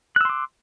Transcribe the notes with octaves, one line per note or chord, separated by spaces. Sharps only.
C6 D6 E6 F#6